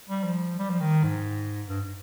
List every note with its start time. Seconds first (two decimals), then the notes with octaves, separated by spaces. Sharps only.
0.09 G3
0.24 F3
0.59 G3
0.70 F3
0.80 D#3
1.03 G#2
1.67 G2